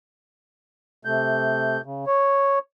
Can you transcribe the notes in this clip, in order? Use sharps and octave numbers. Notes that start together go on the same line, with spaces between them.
C3 A3 G6
C#3
C#5